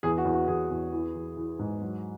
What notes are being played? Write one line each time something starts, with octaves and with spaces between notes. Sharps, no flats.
E2 G#4
F#4
E2
F#4
E2 G#4
E2
E3
E3
E3
G#2
F#3